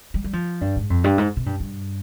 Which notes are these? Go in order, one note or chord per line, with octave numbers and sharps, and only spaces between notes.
G3
G3
F3
G2
G#2
F2
G2
G#2
C3
G2
G2